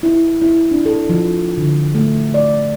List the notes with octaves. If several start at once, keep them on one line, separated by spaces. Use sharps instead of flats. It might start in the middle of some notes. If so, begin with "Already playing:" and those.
E4
E4
D4
A4
F3
D3
A3
D5